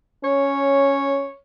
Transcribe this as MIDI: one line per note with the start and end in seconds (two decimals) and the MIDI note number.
0.24 1.28 61
0.24 1.37 73